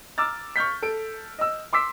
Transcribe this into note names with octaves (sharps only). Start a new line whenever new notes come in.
A#5 D6 E6 F6 A6
C#6 F6 G6 B6
A4 D7
D#5 E6
C6 D6 E6 B6